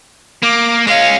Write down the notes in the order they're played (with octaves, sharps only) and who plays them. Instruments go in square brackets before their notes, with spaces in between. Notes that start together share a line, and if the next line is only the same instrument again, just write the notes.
[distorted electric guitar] A#3 [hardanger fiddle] D6
[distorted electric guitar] G#3 C#4 [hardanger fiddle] F5